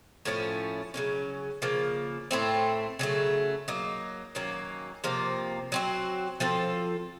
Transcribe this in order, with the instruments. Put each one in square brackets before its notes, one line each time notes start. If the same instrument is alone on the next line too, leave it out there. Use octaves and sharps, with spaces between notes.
[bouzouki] A2 F3 A3 C#4
C#3 F#3 A#3 C#4
C#3 F3 A#3
A2 A3 C4
C#3 F#3 A3
F#3 A#3 D#4
D#3 F#3 A#3 C#4
C3 F3 A#3
F#3 C4 F#4
F3 C4 F4 A4